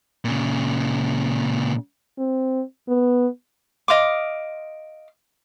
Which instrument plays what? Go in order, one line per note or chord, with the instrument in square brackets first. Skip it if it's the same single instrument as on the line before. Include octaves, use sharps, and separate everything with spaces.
[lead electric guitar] A#2 C#3
[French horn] C4
B3
[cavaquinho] D#5 F5 C6 D6